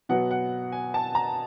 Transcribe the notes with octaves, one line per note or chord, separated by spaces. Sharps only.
B2 F#3 B3 F#5
F#5
G#5
A5
A#5